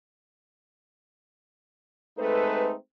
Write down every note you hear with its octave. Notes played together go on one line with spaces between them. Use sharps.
G#3 A3 C4 D#4 A4 B4